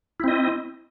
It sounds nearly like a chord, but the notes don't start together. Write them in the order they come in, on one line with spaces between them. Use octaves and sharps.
E4 C4 D#5